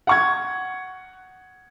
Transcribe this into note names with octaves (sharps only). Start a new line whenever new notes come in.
F#5 C#6 G#6